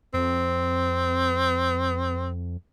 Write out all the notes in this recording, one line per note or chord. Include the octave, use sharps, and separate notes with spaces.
F2 C4